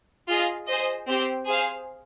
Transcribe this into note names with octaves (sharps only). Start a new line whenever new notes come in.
F4 G#4 D#5
G#4 C5 D#5
C4 G4 C5 G5
G#4 C5 F5